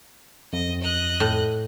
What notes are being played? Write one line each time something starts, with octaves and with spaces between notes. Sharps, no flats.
F2 D#5
D#5 F#6
A2